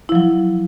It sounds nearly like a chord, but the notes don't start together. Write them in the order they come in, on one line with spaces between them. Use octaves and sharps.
E4 F3 F#3